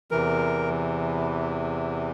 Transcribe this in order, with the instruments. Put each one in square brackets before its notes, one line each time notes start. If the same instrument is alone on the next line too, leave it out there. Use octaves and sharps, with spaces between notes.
[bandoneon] E2 C3 E3 A#4